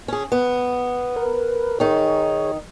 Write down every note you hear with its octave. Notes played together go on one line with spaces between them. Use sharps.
C#4 G#4
B3
A#4 B4
D#3 D#4 G#4 C#5